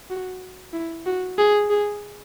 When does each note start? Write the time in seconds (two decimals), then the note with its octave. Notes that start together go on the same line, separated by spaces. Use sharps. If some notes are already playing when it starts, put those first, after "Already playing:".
0.10 F#4
0.73 E4
1.06 F#4
1.38 G#4
1.70 G#4